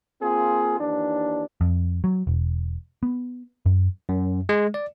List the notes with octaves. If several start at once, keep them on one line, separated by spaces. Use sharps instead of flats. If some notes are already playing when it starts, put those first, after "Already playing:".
A#3 C4 F4 G#4
D#2 E3 D4
F2
F#3
E1
B3
F#2
F#2
G#3
D5